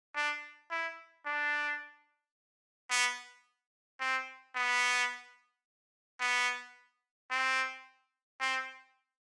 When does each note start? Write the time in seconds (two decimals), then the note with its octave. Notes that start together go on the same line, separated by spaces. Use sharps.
0.16 D4
0.71 E4
1.26 D4
2.90 B3
4.00 C4
4.56 B3
6.20 B3
7.31 C4
8.40 C4